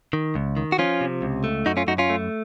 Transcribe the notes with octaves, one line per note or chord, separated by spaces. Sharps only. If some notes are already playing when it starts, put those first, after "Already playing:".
D#3
C#2
D#3
F#4
F3 C#4 F4
C3
C#2
A3
F#2 D#4 F#4
C#4 F4
F#2 D#4 F#4
C#4 F4
A3